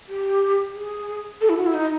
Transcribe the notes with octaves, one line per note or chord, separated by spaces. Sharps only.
G4
G#4
A4
E4
F#4
E4
D#4